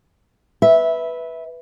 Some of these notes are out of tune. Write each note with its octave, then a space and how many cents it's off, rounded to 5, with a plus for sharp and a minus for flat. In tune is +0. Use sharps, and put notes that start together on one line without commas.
B4 +0 E5 -15